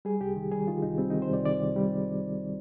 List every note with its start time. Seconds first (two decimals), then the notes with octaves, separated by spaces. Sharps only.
0.05 G3 G#4
0.21 C2 G4
0.36 D#3
0.52 G3 G#4
0.68 D#3 F4
0.83 C2 D#4
0.98 G3 C4
1.10 D#4
1.14 D#3
1.22 C5
1.30 C2 D5
1.45 D#3 D5
1.60 C2
1.76 G3